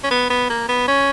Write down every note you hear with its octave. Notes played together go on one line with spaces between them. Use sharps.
C#4
B3
B3
A#3
B3
C#4